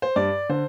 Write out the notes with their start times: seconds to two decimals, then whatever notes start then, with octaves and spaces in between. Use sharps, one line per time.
0.02 C5
0.16 G2 D5
0.49 D3 C5